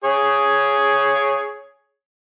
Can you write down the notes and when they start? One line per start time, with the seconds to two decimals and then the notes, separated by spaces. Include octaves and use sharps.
0.04 G#4 C#5